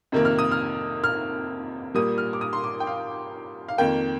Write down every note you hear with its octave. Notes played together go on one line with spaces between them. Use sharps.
F2 C3 D#3 A#3
F6
D#6
F6
F6
A#2 G3 A#3 D#6
F6
D6
D#6
C6
D6
G5
F5
F5
F2 D#3 A#3 G5